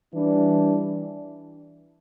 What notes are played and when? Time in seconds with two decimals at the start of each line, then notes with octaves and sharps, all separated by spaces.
0.13 E3 G3 D4